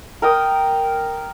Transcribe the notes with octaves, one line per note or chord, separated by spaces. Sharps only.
A#4 G5 D#6